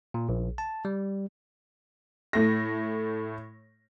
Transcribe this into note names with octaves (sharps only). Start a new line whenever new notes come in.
A#2
A#1
A5
G3
A2 A3 A#6